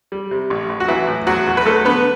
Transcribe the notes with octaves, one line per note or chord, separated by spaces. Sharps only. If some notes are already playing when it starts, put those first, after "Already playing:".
G3
C3
A1
A1
F#4
E3 F#3 E4
A2
E2 F#3 F#4
E2
B4
F#3 A3 A4
D3 B3 B4